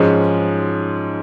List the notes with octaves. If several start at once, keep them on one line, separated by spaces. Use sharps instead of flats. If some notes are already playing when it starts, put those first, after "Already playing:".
Already playing: G#2 F3 G#3 C#4